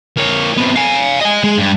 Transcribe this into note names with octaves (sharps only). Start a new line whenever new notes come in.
A#3 C#5
C3 B3
F5 G#5
D#5 G#5
G#3
G2